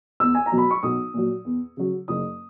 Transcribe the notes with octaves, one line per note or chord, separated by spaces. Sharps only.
E2 E6
G#5
A#5
B2 F#3
B5
C#6
B1 D#6
A#2 F#3
E2
C#3 F#3
F#1 D#6